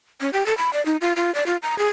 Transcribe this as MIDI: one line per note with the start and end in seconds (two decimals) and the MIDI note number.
0.21 0.30 61
0.33 0.46 67
0.46 0.56 69
0.58 0.72 83
0.73 0.84 74
0.86 0.97 63
1.01 1.13 65
1.16 1.33 65
1.35 1.46 74
1.46 1.57 65
1.63 1.78 82
1.79 1.87 68